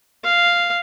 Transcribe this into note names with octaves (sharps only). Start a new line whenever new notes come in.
F5